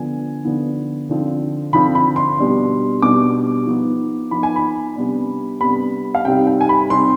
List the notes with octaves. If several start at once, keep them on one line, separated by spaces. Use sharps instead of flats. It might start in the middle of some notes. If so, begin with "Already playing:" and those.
Already playing: D3 F3 B3 G#5
D3 F3 B3
D3 F3 C4
D3 F3 C4 B5
B5
C6
B2 G3 D4
B2 G3 D4 D6
F3 B3 D#4
F3 B3 D#4 B5
G#5
B5
C3 G3 B3 D4
C3 G3 B3 D4 B5
F5
C3 G3 C4 D#4 G5
G5
G#5
B5
C3 G3 C4 D#4 C6